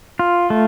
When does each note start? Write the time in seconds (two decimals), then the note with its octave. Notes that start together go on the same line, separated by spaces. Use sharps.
0.19 F4
0.50 A3